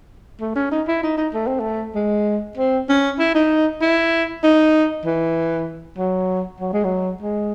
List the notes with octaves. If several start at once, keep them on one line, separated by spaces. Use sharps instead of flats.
A3
C#4
D#4
E4
D#4
D#4
A3
C4
A3
G#3
C4
C#4
E4
D#4
E4
D#4
E3
F#3
F#3
G#3
F#3
G#3